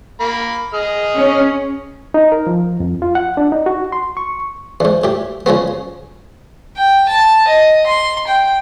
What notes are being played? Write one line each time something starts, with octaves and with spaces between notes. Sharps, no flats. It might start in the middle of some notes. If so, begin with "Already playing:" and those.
A#3 B5
G#4 D#5 F6
C#4
D#4
A#4
F3
F2
F4
F#5
D4
D#4
F#4
C6
C#6
E2 G#2
A2 G4
C#3 F3 G#3 B3
G5
A5
D#5
C6
G5